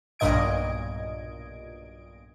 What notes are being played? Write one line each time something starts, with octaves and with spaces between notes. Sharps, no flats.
B1 G2 A#2 D#5 G#6 D7